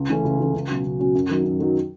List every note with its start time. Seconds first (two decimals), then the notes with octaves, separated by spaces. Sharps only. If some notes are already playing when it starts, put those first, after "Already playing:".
Already playing: C#2
0.09 C#3 E3 A3 C#4
0.24 C#2
0.39 C#3 E3 A3 C#4
0.54 C#2
0.69 B2 F#3 C#4 F#4
0.84 C#2
0.99 B2 F#3 C#4 F#4
1.15 F#2
1.29 D#3 F#3
1.45 F#2
1.60 D#3 F#3